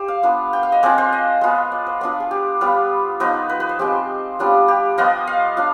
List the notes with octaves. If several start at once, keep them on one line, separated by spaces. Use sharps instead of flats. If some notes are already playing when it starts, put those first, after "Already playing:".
Already playing: G4 C5
F5
B3 D4 F4
G5
F5
D#5
G#3 C4 F4 D5
C5
D#5
G#3 B3 F4
D5
C5
B3 D4 F4 D5
G#4
G4
G3 B3 F4
F3 B3 D#4
B4
B4
C5
F3 G#3 C4 G4
G3 B3 D4 F4
G4
F3 B3 F4 D#5
F5
D4 F4